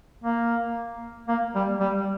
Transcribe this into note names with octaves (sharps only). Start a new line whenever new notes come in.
A#3
A#3
G3
G3